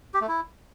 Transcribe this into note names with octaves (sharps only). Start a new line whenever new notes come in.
G4
A3
E4